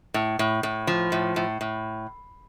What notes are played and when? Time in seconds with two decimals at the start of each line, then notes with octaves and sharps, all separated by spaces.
0.14 A2
0.39 A2
0.63 A2
0.87 F3
1.12 A2
1.36 A2
1.61 A2